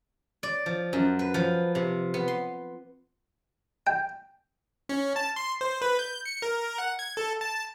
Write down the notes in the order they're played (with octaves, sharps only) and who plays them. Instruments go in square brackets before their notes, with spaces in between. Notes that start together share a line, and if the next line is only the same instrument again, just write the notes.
[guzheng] D5
F3
F#2
B4
F3
C3
B3
C6
[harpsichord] G5
[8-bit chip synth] C#4
A5
C6
C5
B4
G6
C#7
A#4
F#5
G#6
A4
A5